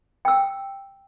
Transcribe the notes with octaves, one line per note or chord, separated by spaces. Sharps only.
G5 E6